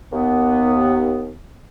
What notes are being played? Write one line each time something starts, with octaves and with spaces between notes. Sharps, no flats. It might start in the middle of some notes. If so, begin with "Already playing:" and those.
D#2 B3